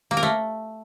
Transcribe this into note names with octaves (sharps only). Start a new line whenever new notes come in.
A#3
A#4
A3